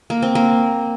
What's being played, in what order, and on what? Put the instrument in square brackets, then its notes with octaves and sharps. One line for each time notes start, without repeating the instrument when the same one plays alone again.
[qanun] A#3
C4
A#3